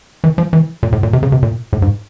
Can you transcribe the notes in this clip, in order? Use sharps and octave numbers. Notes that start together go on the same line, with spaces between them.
E3
F3
E3
A#2
A2
A#2
C3
C#3
C3
A#2
A2
G#2